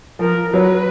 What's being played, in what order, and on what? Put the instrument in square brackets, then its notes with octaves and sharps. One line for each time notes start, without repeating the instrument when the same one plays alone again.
[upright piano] F3 [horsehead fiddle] A#4
[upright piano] F#3 [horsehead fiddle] B4